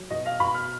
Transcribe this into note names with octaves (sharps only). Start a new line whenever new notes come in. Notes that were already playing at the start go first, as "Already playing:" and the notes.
Already playing: F#3
B2 D#5
F5
B2 B5
F6